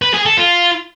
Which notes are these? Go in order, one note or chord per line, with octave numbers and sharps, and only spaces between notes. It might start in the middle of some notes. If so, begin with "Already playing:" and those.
B4
G#4
A4
F4